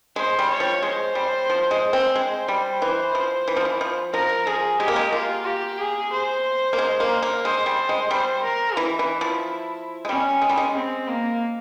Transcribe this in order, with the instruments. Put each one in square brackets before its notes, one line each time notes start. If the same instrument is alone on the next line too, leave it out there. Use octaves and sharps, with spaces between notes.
[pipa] G#3 [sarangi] C5
[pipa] G3
[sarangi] C#5
[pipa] F3
[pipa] G#3 [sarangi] C5
[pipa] G3
F3
G#3
C4
[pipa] G#3 [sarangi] C5
[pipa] G3
E3
F3
E3
F3
E3
F3
[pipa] F3 [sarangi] A#4
[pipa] F3 [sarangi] G#4
[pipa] G#3 [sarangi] G4
[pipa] A#3
G#3
[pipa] A#3 [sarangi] F4
[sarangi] G4
G#4
C5
[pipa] A#3
G#3
A#3
A#3
[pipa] G#3 [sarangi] C5
[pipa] G3
G#3
[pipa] G3 [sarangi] C5
[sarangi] A#4
[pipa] E3 [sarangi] E4
[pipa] E3
F3
G#3
[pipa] G3 [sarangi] C#4
[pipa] G#3
G3
G#3
[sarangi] C4
A#3